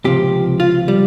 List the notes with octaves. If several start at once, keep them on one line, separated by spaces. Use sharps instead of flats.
C#2 C3 F3 G4
F4
G3